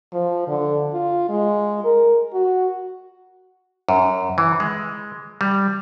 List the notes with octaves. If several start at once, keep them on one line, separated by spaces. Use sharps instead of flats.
F3
D3
F4
G#3
A#4
F#4
F#2
E3
G#3
G3